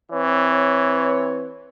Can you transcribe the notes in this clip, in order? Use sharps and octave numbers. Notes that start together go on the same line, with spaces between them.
E3 C4 B4 C#5